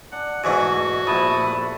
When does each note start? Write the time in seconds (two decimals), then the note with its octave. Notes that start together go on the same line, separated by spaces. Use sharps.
0.12 D4 F#5
0.44 E2 G#2 B2 A3 F#4 E5 G#5
1.07 A#1 A3 B3 E4 A5 D#6
1.42 G2 E5